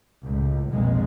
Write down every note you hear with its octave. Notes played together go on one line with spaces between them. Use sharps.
C#2 A2
F1 B1 F2 G#3 A#3